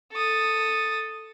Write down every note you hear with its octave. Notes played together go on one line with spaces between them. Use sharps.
A4 D#6